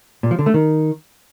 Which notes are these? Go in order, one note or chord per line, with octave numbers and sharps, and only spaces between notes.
A#2
F3
D3
A3
D#3